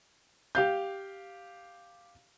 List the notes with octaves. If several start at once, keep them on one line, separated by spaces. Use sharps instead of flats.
G4 F5 G6